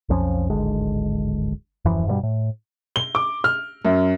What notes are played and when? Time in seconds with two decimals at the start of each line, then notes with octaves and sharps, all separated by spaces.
0.09 B1 F2 F3 C#4
0.50 D1 G#1 D3 G#3
1.85 D#1 F#2 E3 F3
2.07 G2 B2 E3 G3
2.23 A2
2.96 G7
3.15 D6
3.44 F6
3.85 F#2